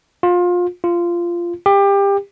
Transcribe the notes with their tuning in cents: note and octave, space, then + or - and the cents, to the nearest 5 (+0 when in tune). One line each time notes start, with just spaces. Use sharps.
F4 +25
F4 -15
G4 +25